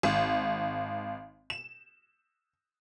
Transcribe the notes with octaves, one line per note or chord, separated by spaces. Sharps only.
G#1
E7